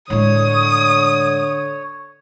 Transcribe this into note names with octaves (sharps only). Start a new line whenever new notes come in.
A2 D3 G#3 C#5 D#6